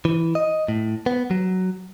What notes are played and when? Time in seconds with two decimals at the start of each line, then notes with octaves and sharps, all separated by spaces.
0.05 E3
0.35 D#5
0.68 A2
1.06 B3
1.31 F#3